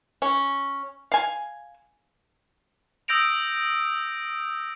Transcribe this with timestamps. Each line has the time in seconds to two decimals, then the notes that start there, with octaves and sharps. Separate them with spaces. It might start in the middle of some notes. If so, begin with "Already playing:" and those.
0.22 C#4
1.12 F5 G#5
3.08 D#6 E6 G6 A#6 D7 F7